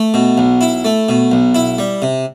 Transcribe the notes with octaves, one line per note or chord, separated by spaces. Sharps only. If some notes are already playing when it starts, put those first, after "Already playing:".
Already playing: A3
B2
B1
E4
A3
B2
B1
E4
G3
C3